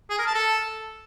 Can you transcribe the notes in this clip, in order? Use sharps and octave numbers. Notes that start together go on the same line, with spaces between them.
G#4
A#4
A5
A4